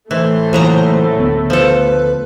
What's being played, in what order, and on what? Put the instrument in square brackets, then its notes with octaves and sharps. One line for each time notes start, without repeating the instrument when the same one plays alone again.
[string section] A2 A3 [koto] E3 [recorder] C5
[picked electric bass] A#2 E3 [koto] C#3 F#3 A#5
[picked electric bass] D2 B3
[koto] F3 A4 [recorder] B4